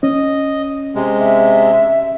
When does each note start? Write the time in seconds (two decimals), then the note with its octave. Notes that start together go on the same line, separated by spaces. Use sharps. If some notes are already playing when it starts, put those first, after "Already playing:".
0.03 C#4 D#5
0.95 C3 G#3
1.19 E5